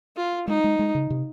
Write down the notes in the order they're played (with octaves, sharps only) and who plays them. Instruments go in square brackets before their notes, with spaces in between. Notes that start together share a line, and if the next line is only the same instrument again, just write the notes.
[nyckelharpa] F4
[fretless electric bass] G#3 [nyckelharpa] D#4
[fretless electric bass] G#3
G#3
C#3
C3